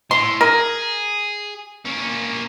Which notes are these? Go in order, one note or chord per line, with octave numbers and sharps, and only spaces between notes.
A2 C6
G#4 A#4
A#3 C#4